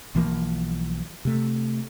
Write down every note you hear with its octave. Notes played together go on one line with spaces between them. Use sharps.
B1 E3 F3 A#3
C3 A3